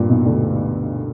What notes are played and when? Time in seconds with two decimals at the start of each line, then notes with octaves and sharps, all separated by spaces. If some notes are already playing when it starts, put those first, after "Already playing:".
Already playing: G2 A#2
0.09 B1 B2
0.25 D2 D3